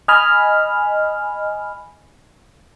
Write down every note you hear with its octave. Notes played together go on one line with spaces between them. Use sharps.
D#5 G#5 B5 F6